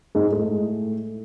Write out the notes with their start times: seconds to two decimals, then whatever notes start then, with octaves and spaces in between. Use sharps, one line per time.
0.15 G#2 G#3
0.32 A2 A3